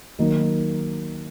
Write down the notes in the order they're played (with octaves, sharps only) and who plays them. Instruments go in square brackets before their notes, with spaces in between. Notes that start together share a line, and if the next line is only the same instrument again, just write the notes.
[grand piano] D#3 F#3 A#3 D#4